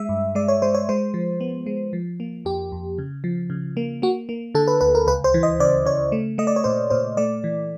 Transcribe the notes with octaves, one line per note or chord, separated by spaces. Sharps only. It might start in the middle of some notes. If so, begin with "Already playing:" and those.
Already playing: G#3 E5
G2
G#3 D5
C#5
G#3 C5
C#5
G#3 C5
F3
B3
G#3
F3
A#3
F2 G4
F2
C#3
F3
C#3
A#3
A#3 F#4
A#3
D3 A4
B4
D2 B4
A#4
C#2 B4
C5
E3
D#5
C#3 D5
C#3 C#5
A3
A3 D#5
D5
C#5
A#2 C5
A#2 C5
A3 D5
E3